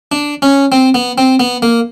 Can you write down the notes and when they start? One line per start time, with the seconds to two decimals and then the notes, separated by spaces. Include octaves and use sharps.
0.12 D4
0.42 C#4
0.72 C4
0.94 B3
1.18 C4
1.40 B3
1.62 A#3